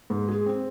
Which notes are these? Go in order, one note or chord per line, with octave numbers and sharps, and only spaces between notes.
G#2
G#4
C4